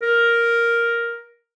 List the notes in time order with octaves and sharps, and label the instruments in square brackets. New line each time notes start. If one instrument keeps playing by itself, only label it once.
[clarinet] A#4